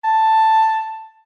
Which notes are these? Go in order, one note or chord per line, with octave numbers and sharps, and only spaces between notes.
A5